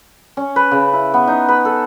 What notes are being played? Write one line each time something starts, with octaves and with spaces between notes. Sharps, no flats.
C#4
B4
C#3
E4
B3
D#4
B4
A4